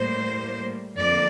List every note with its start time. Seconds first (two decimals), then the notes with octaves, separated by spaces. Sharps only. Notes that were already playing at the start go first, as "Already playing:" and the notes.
Already playing: A2 G3 A#3 C5
0.97 F2 D3 F3 A#3 D5